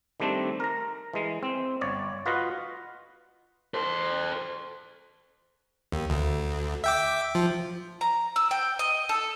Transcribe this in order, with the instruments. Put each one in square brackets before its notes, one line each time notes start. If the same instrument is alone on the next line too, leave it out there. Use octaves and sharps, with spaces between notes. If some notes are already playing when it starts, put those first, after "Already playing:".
[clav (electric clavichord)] D#3 G3 A3 C4 D4
A#4 A#5
E3 G#3
C4
G1 C#5 D5
F4 F#4 B4 D#5 F5 F#5
[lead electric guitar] A4 C5
[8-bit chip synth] D#2
D2
E5 G5 D6
F3
[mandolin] A#5
E6
G5
D#5
A4